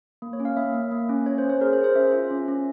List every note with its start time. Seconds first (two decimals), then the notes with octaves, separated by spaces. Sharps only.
0.22 A#3
0.33 C#5
0.40 C#4
0.45 F5
0.57 A#3 E5
0.74 A#3
0.91 A#3
1.09 C#4
1.26 C#4 C#5
1.38 C5
1.44 C#4
1.50 C5
1.61 G#4 A#4
1.73 C5
1.78 G#4
1.84 C5
1.95 C#4 E5
2.13 F4
2.31 C#4
2.48 C#4